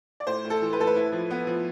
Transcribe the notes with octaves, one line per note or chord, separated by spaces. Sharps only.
D5
A2 C5
A2
A4
E3
B4
A2 A4
B4
E4
F3
B3
F3